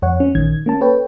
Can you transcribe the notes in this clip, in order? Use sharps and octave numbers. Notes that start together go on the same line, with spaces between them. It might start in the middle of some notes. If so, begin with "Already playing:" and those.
F2 C#5 F#5
C#4
A#1 D#3 G#6
A#3 C#4 A5
A4 B4 C#5 G5